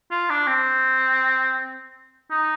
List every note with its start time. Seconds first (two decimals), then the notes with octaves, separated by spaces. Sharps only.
0.11 F4
0.30 D4
0.47 C4
2.31 D#4